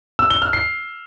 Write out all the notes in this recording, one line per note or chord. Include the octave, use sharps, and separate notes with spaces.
E6
G7
F6
C7